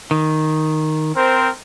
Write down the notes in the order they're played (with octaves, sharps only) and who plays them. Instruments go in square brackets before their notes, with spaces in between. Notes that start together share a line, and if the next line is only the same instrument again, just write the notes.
[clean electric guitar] D#3
[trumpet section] C4 A#4 C5